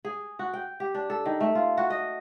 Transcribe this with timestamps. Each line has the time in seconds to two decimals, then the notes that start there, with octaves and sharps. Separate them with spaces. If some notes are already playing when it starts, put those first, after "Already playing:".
0.05 G#4
0.39 F#4
0.53 G5
0.80 G4
0.95 D4
1.10 A4
1.25 D#3
1.41 A3
1.55 F4
1.77 F#4
1.90 D#5